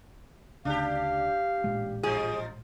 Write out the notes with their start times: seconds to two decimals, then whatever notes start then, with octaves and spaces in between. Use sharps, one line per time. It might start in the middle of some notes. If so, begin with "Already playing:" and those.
0.65 D2 C#3 D4 G4 F5
1.64 A1 A#2 G#3
2.03 F3 D#4 F4 G#4